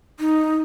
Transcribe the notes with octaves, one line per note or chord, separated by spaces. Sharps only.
D#4